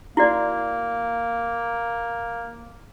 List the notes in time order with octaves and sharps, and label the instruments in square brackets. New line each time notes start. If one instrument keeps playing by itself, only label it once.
[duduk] A#3 [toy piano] E4 F#4 D5